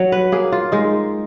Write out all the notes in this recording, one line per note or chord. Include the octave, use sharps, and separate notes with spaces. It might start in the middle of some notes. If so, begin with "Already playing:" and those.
Already playing: F#3 C#5
B4
A#3 G#4
F4
G#3 D#4